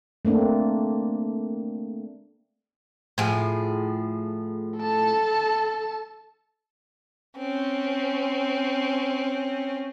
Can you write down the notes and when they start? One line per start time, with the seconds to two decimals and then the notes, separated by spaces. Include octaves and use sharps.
0.25 A3 A#3 C4 D4
3.18 A2 F3 G#4
4.78 A4 A5
7.37 C4 C#4